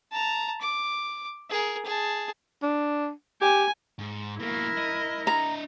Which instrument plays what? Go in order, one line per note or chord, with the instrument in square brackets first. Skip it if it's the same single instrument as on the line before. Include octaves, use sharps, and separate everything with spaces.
[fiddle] A5 A#5
D6
G#4 A#4
G#4 A5
[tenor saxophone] D4
[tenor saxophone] G4 [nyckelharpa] G#5
[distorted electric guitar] G#2
[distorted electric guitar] B2 A#3 [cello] E4 A#4
[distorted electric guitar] D#5
[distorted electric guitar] D4 D#5 [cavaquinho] A#5